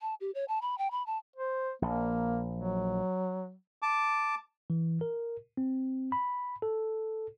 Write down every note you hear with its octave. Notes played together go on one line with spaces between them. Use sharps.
A5
G4
C#5
A5
B5
G5
B5
A5
C5
A#1 A#3
F#3
A5 D6
E3
A#4
C4
B5
A4